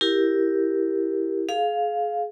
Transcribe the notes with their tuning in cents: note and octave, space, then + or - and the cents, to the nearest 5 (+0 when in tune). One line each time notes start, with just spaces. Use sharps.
E4 +0 G4 +0 A#4 +0
G#4 +30 F5 +5